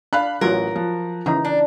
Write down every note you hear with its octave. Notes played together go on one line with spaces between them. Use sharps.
D4 F5 B5 F#6
A1 F#3 F4 A#4
F3
C#3 E3 D#4 A#5
D4